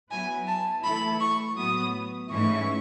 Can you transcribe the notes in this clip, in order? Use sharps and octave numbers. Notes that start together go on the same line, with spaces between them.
F#3 B3 E4 B4 G#5
A5
E3 A3 E4 A4 B5
C#6
A2 F#3 B3 D#6
G#2 E3 A3 C#4 E4 C#6